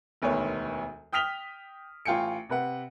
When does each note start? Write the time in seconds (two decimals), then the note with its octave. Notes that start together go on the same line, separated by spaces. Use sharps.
0.22 E1 D2 D#3 B3 C#5
1.13 G5 D#6 F6 B6 F7 G7
2.05 A1 F4 G5 G#5 C#7
2.49 C3 B4 F#5